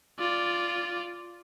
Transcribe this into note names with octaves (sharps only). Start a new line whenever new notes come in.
F4 D5